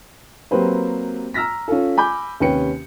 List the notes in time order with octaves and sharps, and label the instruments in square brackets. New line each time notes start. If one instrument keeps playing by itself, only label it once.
[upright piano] F#3 A#3 C4 G4 B4 C5
A#5 E6 F6 A#6 B6
C#4 F4 A4
G#5 B5 D6 G6
D#2 C3 C#4 B4 G5 C#7